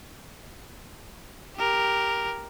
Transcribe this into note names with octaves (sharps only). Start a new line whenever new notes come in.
G4 A#4